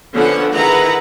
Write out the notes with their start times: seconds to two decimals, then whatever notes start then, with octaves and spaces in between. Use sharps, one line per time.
0.13 D3 F3 B3 C#4 A4 F#5
0.52 D#3 E4 G#4 B4 F#5 A#5